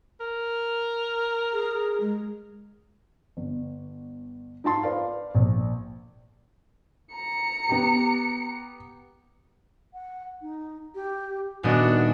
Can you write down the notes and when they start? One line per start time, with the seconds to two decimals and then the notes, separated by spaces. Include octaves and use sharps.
0.20 A#4
1.53 G#4
2.01 G#3
3.37 G1
4.64 D#4 F4 A5 C6
4.83 B4 C5 D5 F5
5.35 A#1
7.13 A#5 C#7
7.69 B3 G4
9.93 F#5
10.42 D#4
10.95 G4
11.63 D#1 B3 D4 F#4 D#5 G#5